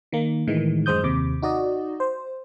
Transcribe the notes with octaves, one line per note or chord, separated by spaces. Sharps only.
D#3 A#3
A2 D#3 E3 G#3
F#2 G#3 C5 D#6 G6
D#2 C3 D6
D#4 F#4 D5 D#5
C5